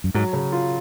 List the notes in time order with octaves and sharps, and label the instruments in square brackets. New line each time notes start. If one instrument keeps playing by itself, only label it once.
[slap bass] F#2
[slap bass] G#2 [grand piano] F#3
[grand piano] C#3
F4